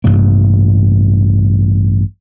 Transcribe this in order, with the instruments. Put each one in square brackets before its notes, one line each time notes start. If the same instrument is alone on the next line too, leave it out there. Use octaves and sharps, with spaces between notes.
[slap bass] A1 G2 C3 A#3